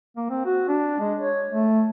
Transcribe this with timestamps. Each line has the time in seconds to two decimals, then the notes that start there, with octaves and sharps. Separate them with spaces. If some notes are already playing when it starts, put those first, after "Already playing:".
0.17 A#3
0.30 C4
0.45 F#4
0.68 D4
1.00 G#3
1.19 C#5
1.50 A3